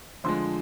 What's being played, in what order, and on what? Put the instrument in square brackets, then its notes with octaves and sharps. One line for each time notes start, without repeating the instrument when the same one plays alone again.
[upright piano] F2 D3 F3 G#3 C6